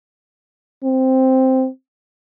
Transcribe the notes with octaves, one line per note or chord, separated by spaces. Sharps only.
C4